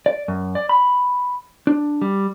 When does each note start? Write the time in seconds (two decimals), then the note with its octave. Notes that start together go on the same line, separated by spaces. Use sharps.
0.06 D5
0.28 F#2
0.55 D5
0.69 B5
1.67 D4
2.01 G3